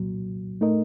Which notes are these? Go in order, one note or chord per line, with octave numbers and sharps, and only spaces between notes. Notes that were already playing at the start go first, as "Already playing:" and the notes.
Already playing: C2 A#2 F#3
A2 A3 D#4 A#4 D#5